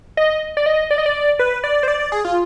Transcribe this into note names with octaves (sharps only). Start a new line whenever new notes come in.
D#5
D5
D#5
D5
D#5
D5
B4
D5
C5
D5
D5
G#4
F4